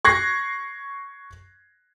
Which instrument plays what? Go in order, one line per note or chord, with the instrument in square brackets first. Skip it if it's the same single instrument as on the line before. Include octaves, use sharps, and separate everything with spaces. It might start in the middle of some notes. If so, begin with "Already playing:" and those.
[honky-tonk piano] C#6 F#6 G#6 A#6 C7